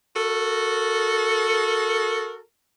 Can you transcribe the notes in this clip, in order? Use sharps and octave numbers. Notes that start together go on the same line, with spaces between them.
F#4 A4 A#4